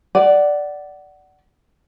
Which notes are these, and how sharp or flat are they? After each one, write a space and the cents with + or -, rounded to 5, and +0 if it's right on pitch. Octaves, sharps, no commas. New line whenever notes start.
D5 +0 F#5 +15